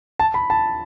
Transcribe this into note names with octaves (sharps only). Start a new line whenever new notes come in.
A5
B5
A5